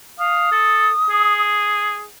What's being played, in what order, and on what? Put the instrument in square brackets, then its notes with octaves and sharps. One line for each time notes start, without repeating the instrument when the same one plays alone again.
[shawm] F5 [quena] D#6
[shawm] A4
G#4